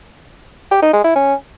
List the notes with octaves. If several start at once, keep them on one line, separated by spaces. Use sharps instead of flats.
G4
D#4
G#3
E4
C#4